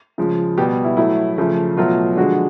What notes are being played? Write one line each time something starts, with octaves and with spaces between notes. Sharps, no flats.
C#3 F3 G#3
B2 G3 G4
E4
A2 F#3 A3 E4
C#3 F3 A3
B2 F#3 A3 F4
D3 F3 G#3 F#4